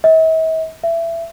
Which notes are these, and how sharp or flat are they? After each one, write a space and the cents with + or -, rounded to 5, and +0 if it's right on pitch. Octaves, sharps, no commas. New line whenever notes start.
E5 -45
E5 +20